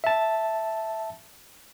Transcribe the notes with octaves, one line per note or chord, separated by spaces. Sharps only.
E5 A5